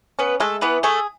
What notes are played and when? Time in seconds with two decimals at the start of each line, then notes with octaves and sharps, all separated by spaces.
0.19 B3 C#4 B4
0.40 G#3 A3 A4
0.61 E3 B3 B4
0.83 A3 G#4 A4